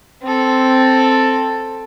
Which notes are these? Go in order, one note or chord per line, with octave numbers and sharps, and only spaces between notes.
C4 A4